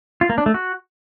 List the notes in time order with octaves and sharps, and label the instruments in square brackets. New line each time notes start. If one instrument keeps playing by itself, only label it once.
[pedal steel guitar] F4
A#3
D4
A3
F#4